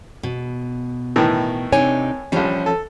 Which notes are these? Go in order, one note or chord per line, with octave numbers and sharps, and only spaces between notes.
B2
A2 D#3 E3
C3 D4 D#4 C#5 G#5
A#1 F3 G3 C#4
A4